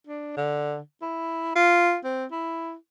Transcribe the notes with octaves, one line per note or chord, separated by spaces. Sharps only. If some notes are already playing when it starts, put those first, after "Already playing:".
D4
D3
E4
F4
C4
E4